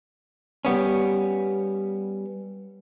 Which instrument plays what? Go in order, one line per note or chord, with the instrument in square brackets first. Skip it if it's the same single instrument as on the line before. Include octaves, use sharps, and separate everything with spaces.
[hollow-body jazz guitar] G3 B3 C#4